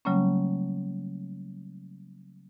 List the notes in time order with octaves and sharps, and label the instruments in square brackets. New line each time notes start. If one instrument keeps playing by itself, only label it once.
[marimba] C#3 F#3 G3 A3 A#3 C#4